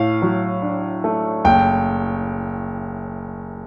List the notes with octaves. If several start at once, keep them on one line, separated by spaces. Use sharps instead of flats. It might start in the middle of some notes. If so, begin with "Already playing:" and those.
Already playing: A2 F5
F#3
D4
A3
F#1 G5